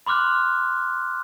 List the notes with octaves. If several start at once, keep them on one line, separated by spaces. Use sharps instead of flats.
B5 C6 D6 F6 F#6